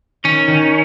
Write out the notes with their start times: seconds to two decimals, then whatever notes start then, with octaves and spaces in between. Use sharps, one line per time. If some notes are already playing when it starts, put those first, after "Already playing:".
0.24 D#3 C#4
0.48 D#3